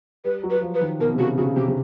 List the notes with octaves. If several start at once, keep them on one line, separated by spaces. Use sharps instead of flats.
G3 B4
F#3
B4
F#3
F3
B4
D#3
B2 A#4
C3
C#3 F#4
C#3 F#4
C3 G4
C3